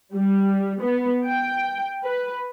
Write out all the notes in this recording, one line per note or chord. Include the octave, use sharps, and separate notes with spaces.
G3
B3
G5
B4